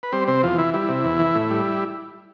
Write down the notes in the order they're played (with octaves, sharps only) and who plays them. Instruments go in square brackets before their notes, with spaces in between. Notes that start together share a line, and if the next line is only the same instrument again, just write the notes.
[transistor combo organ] B4
G3 C4 C5
C3 C4 C5
E2 F3 F4
E3 E4
G3 E4
C3
E2
E3
A2
G3